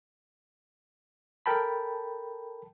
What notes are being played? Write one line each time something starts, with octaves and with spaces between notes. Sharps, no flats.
A4 A#4 G5 A5 B5